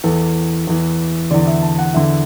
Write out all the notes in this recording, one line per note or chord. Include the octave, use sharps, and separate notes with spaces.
E2 E3 A4
E2 E3
E2 D3 D5
E5
A5
F#5
E2 D3 E5